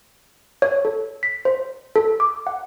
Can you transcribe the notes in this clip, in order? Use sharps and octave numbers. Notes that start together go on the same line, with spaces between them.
C#5
A4
B6
C5
A4
D6
F#5